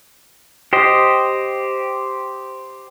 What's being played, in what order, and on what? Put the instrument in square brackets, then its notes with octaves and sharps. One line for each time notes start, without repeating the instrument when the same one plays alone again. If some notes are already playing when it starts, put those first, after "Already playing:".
[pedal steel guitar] G4 C5 D#5